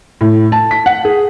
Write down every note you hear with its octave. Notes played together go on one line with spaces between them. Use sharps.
A2
A5
B6
F#5
G#4